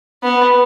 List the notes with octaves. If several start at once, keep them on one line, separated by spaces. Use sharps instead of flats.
B3